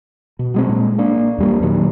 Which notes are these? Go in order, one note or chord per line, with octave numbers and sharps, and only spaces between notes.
B2
F#3 G#3 C4
A#2 G#3
A#3 D4
E2 G3 A#3
A#2 D#3 F#3 G3